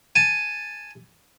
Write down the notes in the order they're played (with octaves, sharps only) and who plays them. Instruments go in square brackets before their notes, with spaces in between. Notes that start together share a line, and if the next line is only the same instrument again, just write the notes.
[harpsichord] G#5 A5